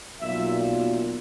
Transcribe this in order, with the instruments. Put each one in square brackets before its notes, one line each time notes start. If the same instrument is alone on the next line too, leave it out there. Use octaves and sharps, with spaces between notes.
[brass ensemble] B1 A#2 F#3 E5